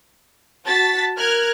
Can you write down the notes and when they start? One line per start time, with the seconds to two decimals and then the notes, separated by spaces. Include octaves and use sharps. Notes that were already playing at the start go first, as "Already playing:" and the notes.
0.67 F#4 A5 A6 B6
1.17 A#4 F6 F#6 G#6